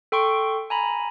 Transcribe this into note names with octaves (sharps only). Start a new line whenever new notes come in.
A4 G5 C6 C#6 D7
G#5 A#5 B5